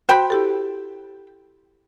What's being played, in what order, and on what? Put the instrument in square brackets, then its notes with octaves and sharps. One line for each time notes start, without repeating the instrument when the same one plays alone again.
[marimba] F#4 [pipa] C5 G5 B5
[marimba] E4 G4 A4